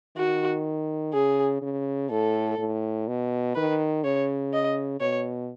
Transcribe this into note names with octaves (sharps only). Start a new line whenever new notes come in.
D#3 F#4
C#3 G#4
C#3
A2 A4
A2
B2
D#3 B4
C#3 C#5
D#5
B2 C#5